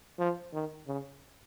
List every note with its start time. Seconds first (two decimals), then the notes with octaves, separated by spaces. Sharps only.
0.19 F3
0.53 D#3
0.88 C#3